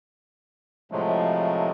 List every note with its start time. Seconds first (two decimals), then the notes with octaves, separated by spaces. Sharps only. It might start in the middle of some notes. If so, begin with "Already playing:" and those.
0.92 A2 C3 F3 F#3 G#3 A3